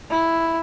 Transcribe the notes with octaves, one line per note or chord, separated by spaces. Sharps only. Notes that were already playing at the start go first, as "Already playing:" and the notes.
E4